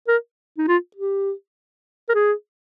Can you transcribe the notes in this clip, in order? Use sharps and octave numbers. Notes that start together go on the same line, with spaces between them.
A#4
D#4
F4
G4
A#4
G#4